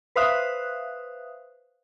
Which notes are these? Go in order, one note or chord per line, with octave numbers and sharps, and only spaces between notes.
B4 C5 E5 F5 D#6 F#6